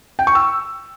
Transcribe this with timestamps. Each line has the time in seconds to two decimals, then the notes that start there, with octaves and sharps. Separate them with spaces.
0.19 G5
0.27 C#6
0.35 E6